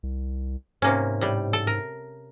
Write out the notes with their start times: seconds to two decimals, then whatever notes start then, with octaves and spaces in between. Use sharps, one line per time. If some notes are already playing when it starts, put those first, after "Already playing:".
0.03 C2
0.82 G#2 C3 A#3 C#4
1.21 A2 G3
1.53 A4
1.67 A#4